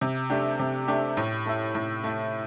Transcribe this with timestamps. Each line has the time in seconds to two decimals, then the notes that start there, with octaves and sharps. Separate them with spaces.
0.01 C3
0.30 A3 D4 G4
0.59 C3
0.88 A3 D4 G4
1.17 A2
1.46 A3 E4
1.75 A2
2.04 A3 E4